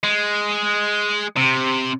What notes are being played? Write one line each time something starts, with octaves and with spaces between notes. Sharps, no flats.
G#3
C3